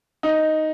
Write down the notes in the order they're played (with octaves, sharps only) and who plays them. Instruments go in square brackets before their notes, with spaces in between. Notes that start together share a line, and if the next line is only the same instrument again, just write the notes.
[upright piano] D#4